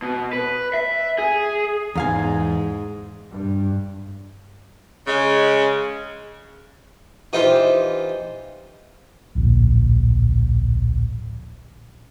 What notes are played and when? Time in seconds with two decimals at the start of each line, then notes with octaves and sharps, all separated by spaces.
0.02 B2
0.33 B4
0.74 E5
1.18 G#4
1.96 E2 G#2 F5 G#5
3.31 G2
5.07 C#3 G#3
7.33 E3 D#4 F4 G4 C5
9.35 D1 A#1